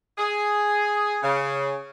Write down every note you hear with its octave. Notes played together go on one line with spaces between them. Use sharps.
G#4
C#3